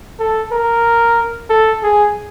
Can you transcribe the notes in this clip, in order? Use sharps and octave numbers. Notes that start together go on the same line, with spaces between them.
A4
A#4
A4
G#4